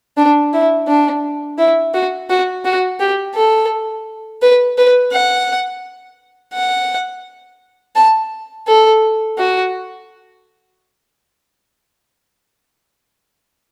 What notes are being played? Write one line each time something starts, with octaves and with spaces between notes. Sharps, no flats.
D4
E4
D4
E4
F#4
F#4
F#4
G4
A4
B4
B4
F#5
F#5
A5
A4
F#4